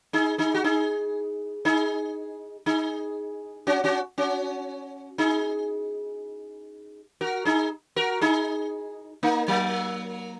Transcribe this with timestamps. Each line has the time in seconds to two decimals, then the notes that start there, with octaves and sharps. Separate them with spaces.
0.13 D#4 G#4
0.38 D#4 G#4
0.54 F#4
0.64 D#4 G#4
1.65 D#4 G#4
2.66 D#4 G#4
3.67 C#4 F#4
3.84 C#4 F#4
4.18 C#4 F#4
5.18 D#4 G#4
7.21 F#4 A#4
7.45 D#4 G#4
7.96 F#4 A#4
8.21 D#4 G#4
9.23 A#3 D#4
9.48 F#3 A#3